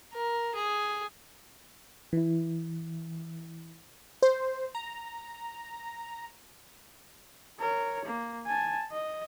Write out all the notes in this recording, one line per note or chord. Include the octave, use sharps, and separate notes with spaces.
A#4
G#4
E3 E4
C5
A#5
A#4 C#5
A#3
G#5 A5
D#5